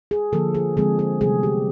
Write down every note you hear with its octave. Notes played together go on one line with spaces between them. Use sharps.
G#4
D3 F3 A#3 A4
G#4
D3 F3 G#3 C4 G#4
G#4
C3 E3 G3 B3 G#4
G4